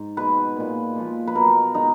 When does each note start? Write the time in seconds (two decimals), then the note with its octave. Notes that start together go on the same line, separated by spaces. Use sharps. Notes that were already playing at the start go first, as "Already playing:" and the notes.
Already playing: G#2
0.17 B2 G#3 B4
0.56 A#2 G#3
0.95 A#2 F3 G#3
1.27 B4
1.35 B2 F#3 A#4
1.75 D#3 G#3 D#4